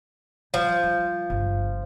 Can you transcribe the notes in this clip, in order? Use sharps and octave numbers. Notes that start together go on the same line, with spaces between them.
F3 G3
G3
G1 C#3